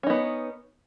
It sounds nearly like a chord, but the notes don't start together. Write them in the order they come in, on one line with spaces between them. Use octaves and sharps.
C#4 D#4 B3